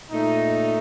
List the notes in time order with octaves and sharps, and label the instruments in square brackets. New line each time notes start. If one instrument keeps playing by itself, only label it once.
[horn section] A#2 A3 D#4